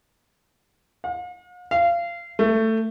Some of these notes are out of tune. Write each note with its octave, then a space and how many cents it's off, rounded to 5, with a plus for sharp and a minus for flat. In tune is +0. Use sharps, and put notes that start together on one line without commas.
F5 +45
F5 -25
A3 +15